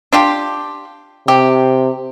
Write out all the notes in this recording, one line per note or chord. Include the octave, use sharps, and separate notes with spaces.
D4 F4 G4
C3 G4